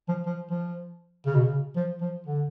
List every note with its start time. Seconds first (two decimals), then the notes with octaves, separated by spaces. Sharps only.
0.08 F3
0.26 F3
0.50 F3
1.26 C#3
1.35 B2
1.44 C#3
1.76 F3
2.01 F3
2.26 D3